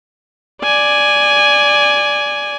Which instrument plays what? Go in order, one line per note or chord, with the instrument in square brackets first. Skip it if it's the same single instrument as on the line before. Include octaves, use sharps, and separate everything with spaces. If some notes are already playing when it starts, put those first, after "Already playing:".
[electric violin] D5 G#5